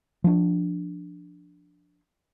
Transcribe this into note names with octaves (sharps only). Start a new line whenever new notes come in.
F3 D4